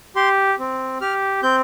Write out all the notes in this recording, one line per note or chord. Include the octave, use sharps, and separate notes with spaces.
G4 C6
C4
G4 F6
C4 G6